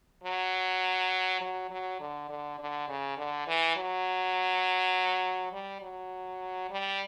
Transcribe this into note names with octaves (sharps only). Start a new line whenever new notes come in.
F#3
F#3
F#3
D3
D3
D3
C#3
D3
E3
F#3
G3
F#3
G3